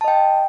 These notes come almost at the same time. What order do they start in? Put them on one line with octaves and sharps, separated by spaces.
A5 D#5 G5